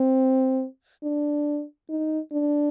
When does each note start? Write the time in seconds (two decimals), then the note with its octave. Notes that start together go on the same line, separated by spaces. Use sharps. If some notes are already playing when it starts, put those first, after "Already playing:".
Already playing: C4
1.03 D4
1.90 D#4
2.32 D4